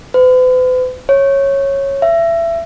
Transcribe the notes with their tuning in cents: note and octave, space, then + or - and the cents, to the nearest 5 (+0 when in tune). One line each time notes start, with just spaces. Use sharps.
B4 +45
C#5 -10
E5 +25